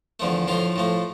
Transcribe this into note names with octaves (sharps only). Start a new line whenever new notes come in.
E2 D3 F3 A3
A2 F3 A3 F4
A2 F3 A3